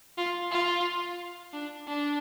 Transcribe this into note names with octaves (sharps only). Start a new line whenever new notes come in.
F4
F4
D4
D4